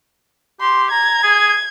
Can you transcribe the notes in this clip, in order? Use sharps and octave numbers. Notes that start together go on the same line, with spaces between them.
G4 C6
A#5 G#6
G#4